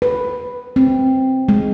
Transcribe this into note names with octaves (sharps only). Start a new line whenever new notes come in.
B4
C4
G#3